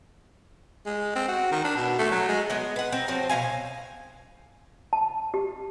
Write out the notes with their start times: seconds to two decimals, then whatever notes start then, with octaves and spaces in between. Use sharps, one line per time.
0.86 G#3
1.15 C4
1.28 F#4
1.52 D#3
1.64 D4
1.76 B2
1.99 A3
2.11 F#3
2.28 G#3
2.50 G#3 B3 D#5
2.76 B4 F#5
2.92 C4 A#4
3.08 F3 F#3 C4 C5
3.29 B2 A#3 F5 G#5
4.93 A5
5.34 G4